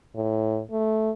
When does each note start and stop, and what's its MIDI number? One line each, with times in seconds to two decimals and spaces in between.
0.16 0.61 45
0.71 1.11 57